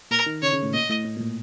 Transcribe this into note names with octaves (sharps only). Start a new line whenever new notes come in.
A#2 A#4
D#3
C#3 C#5
C#3
A2
A#2 D#5
A2
A2
A#2
A2